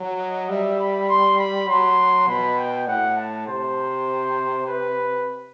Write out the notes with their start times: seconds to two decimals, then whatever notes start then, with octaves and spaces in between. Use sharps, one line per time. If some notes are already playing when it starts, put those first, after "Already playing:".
Already playing: F#3
0.19 D#5
0.49 G3 E5
0.79 B5
1.09 C6
1.38 B5
1.68 F#3 C6
2.27 B2 B5
2.58 G5
2.87 A2 F#5
3.17 A5
3.47 C3 C5
4.66 B4